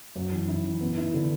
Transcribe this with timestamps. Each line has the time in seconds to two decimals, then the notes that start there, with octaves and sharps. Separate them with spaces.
0.16 F#2
0.32 E3
0.48 E4
0.64 E3
0.81 B3
0.97 E4
1.14 D3